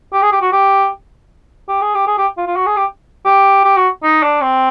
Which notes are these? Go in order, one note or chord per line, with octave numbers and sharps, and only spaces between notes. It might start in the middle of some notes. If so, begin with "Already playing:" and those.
G4
G#4
G4
F#4
G4
G4
G#4
G4
G#4
G4
F4
F4
F#4
G#4
G4
G4
G4
F#4
D#4
D4
C4